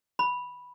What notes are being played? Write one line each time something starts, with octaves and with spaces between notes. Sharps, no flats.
B5